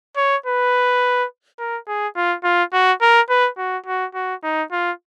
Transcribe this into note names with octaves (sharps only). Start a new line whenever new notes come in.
C#5
B4
A#4
G#4
F4
F4
F#4
A#4
B4
F#4
F#4
F#4
D#4
F4